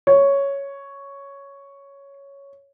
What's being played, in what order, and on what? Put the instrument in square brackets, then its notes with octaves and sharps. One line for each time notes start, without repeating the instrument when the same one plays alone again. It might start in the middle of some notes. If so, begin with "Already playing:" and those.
[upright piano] C#5